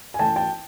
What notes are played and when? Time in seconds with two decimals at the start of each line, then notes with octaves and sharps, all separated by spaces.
0.14 G#5
0.19 E3 A3 C#4 G5 A5
0.36 G5 A5